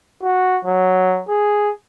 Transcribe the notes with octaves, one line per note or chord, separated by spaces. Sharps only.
F#4
F#3
G#4